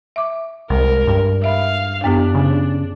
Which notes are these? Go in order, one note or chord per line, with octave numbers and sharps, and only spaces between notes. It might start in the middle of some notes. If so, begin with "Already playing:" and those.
E5 C#6 D6
C2 G#3 A#4
G2
E5 F5 B5
F#2 B3 D4 G4
C#3